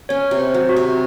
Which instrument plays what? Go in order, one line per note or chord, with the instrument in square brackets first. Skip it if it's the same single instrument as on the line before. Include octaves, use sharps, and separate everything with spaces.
[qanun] C#4 [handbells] C#5
[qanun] C3
[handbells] C5
[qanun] F#3
[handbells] F#4
[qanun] C3